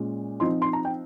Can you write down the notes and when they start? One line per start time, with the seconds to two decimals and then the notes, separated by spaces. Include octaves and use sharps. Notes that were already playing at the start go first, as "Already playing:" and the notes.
Already playing: A#2 G#3 C#4
0.40 F3 C4 D#4 C6
0.62 C6
0.73 A#5
0.85 G5